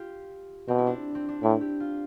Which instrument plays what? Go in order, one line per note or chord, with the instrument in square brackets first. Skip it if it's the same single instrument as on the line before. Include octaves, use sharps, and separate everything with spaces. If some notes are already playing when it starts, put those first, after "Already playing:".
Already playing: [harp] F4 G4
[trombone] B2 [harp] C4
[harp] E4
D4
C4
D4
[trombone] A2 [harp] E4
[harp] G4
F4